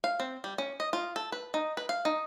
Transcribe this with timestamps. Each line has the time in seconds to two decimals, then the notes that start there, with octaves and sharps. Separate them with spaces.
0.04 F5
0.20 C4
0.44 G3
0.58 C#4
0.80 D#5
0.93 F4
1.16 A4
1.32 B4
1.54 D#4
1.77 B4
1.89 F5
2.05 D#4